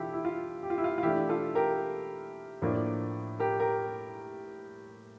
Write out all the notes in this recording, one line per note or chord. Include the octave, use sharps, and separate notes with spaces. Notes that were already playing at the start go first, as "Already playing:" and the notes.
Already playing: E3 D4 E4 F4 G4 A4
E4
F4
G4
F4
E4
F4
F4
E3 A3 D4 E4 G4
F4 A4
G4 A#4
A2 F3 A#3 D4
G4 A#4
G4 A#4